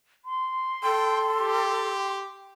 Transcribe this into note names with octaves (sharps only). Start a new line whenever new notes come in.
C6
A4 G5
G4